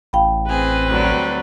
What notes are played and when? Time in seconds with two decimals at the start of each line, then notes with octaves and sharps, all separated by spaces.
0.13 A1 F5 G5 B5
0.49 C4 G#4 B4
0.87 D2 F#3 G3